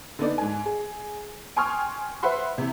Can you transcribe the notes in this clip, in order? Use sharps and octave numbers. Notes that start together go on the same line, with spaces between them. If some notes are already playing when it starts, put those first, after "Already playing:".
D3 B3 D#4 D5
G#2 G#5
G#4
G5 G#5 C6 C#6 D#6 F6
B4 C5 E5 F#5 B5 C6
C3 E3